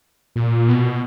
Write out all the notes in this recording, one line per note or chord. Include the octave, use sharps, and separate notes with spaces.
A#2
B2